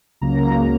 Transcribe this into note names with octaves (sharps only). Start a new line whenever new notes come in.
C#2 C#3 F#3 A#3 A#5